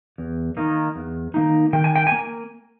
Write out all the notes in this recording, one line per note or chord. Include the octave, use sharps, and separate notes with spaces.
E2
D#3 A#3 D#4
E2
D#3 A#3 D#4
D#3 G5
G#5
G5
A#3 G#5